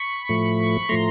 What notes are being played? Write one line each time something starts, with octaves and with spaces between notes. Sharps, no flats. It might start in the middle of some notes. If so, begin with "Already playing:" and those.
Already playing: B5 C#6
A2 F3 A3
A2 F3 A3 A#5 C6